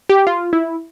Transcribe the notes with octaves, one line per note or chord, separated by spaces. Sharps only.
G4
F4
E4